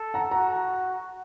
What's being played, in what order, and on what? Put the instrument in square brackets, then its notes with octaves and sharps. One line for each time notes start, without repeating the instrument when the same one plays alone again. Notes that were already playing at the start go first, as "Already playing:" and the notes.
Already playing: [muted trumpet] A4
[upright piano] F#5 A#5
[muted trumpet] F#4 [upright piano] F#5 A#5